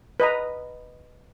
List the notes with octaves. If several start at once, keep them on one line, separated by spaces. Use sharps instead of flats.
B4 D#5 A#5